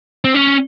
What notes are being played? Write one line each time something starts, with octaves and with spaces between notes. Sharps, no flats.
C4
C#4